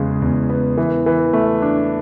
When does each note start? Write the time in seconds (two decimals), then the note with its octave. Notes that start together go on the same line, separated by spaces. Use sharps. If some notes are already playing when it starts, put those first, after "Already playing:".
Already playing: E2 C#3 G#3 B3
0.22 E2
0.50 B3
0.77 E3
1.06 E3
1.33 A3
1.62 D4